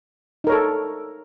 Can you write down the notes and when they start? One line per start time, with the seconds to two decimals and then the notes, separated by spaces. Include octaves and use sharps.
0.44 D#4
0.47 A#4
0.49 C#5
0.52 A4